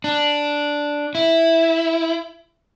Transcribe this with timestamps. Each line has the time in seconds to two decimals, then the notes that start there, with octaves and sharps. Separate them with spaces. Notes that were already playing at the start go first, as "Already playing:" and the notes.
0.04 D4
1.15 E4